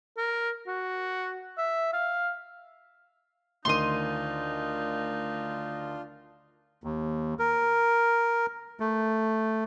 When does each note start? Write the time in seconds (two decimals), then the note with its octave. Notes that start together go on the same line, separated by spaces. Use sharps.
0.17 A#4
0.67 F#4
1.58 E5
1.93 F5
3.65 D2 D#3 D4 D#4 F4 C6 D#6
6.84 D#2
7.39 A#4
8.80 A3